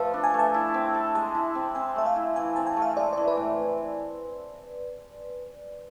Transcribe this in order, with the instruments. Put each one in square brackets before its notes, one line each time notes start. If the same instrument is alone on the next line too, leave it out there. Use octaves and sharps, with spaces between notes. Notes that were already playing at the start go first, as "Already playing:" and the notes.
Already playing: [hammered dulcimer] F3 A3 A4 [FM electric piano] B4
[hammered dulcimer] D4
[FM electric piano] G#5
[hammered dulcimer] A3
[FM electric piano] A5
[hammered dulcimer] E4
C4
A4
[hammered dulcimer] G#3 [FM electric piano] A5
[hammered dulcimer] E4
C4
[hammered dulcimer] C4 [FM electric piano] G#5
[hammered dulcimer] A3 [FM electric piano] E5
[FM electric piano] F5
[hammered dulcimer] E4
[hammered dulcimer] E3 [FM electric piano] G#5
[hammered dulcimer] C4 [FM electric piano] A5
[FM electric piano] G#5
[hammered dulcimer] A3
[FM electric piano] F5
[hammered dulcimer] G#3 [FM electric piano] D5
[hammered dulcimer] E3 [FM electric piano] D5
[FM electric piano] B4
[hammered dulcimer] A2